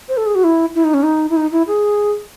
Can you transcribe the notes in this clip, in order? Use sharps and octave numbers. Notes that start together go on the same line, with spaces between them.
C5
A4
G#4
F#4
E4
E4
D#4
C#4
D#4
E4
D#4
E4
G#4